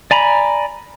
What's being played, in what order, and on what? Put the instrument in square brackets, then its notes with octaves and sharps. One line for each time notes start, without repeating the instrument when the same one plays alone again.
[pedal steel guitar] D5 G#5 A#5 B5